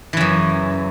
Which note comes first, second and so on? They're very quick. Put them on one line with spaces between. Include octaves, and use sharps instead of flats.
E3 C#3 F#2